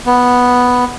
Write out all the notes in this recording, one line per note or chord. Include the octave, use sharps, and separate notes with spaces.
B3